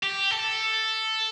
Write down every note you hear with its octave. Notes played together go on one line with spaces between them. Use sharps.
G4
A4